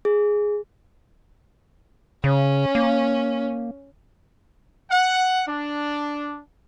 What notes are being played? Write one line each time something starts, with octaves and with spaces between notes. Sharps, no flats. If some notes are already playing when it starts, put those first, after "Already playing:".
G#4
C#3 C#4
A#3
F#5
D4